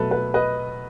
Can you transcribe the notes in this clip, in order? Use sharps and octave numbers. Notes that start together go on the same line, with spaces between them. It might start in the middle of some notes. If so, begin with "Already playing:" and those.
Already playing: B2 F#3 A3 A4 B4
B4
B4 D#5